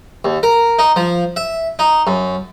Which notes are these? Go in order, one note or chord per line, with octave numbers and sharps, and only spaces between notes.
D#2
A#4
D#4
F3
E5
D#4
F#2